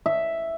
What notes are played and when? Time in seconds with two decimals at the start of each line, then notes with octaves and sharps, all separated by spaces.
0.06 E5